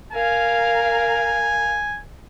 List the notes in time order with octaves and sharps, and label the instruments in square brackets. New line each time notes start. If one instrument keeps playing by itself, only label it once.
[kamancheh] A#4 F5 [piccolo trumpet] G#5